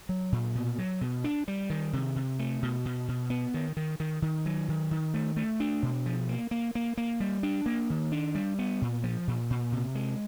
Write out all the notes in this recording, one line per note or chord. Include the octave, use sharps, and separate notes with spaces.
F#3
A#2
B2
F#3
B2
D4
G3
D#3
C3
C3
A3
B2
B2
B2
B3
D#3
D#3
D#3
D#3
F#3
D#3
D#3
A3
A3
D4
B2
F3
A#3
A#3
A#3
A#3
G3
D4
A#3
D#3
D4
G3
B3
A#2
F3
A#2
A#2
C3
G#3